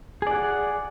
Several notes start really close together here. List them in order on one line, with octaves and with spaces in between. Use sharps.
G#4 D5 F#5